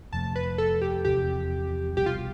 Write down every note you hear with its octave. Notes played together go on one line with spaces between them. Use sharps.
F2 C3 F3 A3 A5
B4
A4
G4
E2 C3 F3 G4
C2 B2 G3 G4
F4